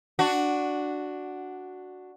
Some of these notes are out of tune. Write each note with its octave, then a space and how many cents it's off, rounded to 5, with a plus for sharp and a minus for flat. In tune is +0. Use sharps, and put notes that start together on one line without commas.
D4 +0 F#4 +0